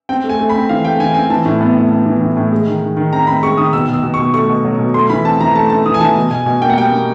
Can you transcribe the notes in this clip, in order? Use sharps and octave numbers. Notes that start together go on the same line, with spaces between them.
C4 G5
A3
G#5
A3
B5
C4
E3 F5
A3 G5
E3 G#5
C4 G#5
E3 A5
A2
B3
A2
B3
E3
A2
A2
G#3
D#3
D#3
D#3
C4 A#5
C4 B5
G#3 C#6
D#3 D#6
B2 E6
B2
E6
B2
C#6
B2
A3 C#6
B2
F#3
B2
A3 C6
E3 B5
C4 A5
E3 A#5
A3 A5
A3 A5
E3 D#6
G#5
E3 A5
B2
B2 G#5
B2 G#5
A#3 G5
F#5
G3 G5
A#3